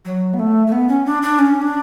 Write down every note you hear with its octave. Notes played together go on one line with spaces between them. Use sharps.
F#3
B3
A3
A3
B3
C#4
D4
D4
C#4
D4